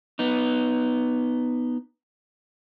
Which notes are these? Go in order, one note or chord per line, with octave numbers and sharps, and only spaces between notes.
B3 D#4